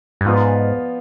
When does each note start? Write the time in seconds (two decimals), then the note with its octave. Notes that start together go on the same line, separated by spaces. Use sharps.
0.21 G2
0.25 G#2 F3 B3 F4 B4 D5